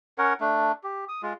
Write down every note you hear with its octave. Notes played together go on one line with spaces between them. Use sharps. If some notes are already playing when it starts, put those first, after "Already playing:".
C#4 A#4 C#5 F#5
A3 D4
G4
D#6
G#3 F4